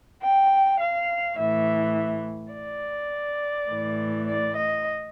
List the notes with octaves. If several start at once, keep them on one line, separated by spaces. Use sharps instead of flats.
G5
F5
A2 E3 E5
D5
A2 E3
D5
D#5